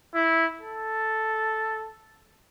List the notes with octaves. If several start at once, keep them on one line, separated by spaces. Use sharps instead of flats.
E4
A4